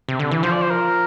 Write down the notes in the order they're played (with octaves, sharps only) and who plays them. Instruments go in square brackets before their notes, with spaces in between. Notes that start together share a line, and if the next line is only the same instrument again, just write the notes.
[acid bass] C3
D3
E3
[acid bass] F3 [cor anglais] C5
[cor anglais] D5
C5
A#4